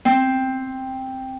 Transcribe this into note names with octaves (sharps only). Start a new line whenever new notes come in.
C4